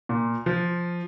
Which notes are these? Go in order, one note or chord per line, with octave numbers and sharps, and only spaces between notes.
A#2
F3